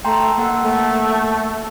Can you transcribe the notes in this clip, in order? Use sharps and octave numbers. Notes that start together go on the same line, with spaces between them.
A3 G5 A#5 C6
A#3 A4 F#5
A3